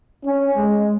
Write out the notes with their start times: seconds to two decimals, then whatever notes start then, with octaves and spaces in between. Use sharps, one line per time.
0.25 C#4
0.57 G#3